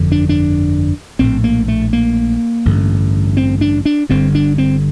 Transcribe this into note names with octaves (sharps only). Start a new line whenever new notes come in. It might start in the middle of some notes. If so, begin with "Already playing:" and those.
Already playing: G1 F2 D3
D4
D4
A#1 A2 C4
A#3
A3
A#3
A1 G2 D3
C4
D4
D4
G1 G2 D3 C4
D4
C4